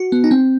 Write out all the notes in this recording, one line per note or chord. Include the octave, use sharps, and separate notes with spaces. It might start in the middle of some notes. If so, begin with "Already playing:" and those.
Already playing: F#4
B3
D#4
C4